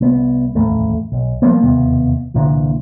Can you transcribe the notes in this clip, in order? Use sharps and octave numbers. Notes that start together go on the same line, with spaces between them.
C2 B3
D#1 A1 F2 A3
B1
F3 G3 A#3 B3
E1 D#2 C3 B3
C2 A#2 D3 E3